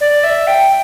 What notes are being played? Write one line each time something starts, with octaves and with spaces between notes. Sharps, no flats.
D5
E5
G5